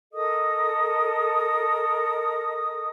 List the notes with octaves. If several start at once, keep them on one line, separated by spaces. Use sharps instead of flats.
A4 A#4 D#5 D#6